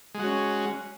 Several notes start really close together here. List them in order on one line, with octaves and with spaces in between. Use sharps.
G#3 F#4 C#4